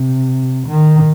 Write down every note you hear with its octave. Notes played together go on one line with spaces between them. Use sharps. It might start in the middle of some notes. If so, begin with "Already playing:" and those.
Already playing: C3
D#3